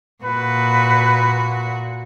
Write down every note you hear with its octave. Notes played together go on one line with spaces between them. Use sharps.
A#2 F#4 B4